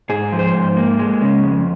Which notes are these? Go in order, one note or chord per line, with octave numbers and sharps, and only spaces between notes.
G#2 G#4
F3
C5
G#2
A#3
G#3
C#3
F2